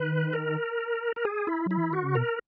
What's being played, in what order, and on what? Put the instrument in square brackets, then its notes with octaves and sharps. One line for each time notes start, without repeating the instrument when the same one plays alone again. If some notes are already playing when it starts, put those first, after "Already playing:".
Already playing: [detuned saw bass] D#3 [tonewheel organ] B4
[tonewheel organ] A#4
A#4
G#4
E4
[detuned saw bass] F#3 [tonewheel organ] E4
[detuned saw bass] E3
[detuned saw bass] D#3 [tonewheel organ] F#4
[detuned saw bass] C#3
[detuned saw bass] B2 [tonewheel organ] A#4